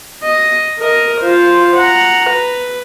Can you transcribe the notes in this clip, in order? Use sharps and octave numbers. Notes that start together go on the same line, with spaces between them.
D#5
A#4 D#5
F4 C5
F#5 A#5
B4